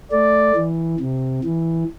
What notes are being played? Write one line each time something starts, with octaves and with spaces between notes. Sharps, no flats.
A3 D5
E3
C3
E3